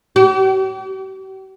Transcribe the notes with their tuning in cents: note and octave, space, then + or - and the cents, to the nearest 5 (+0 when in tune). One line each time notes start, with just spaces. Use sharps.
G4 -45